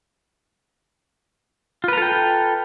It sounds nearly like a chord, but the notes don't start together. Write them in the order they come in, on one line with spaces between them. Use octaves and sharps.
F4 B4 A#5 A4 G5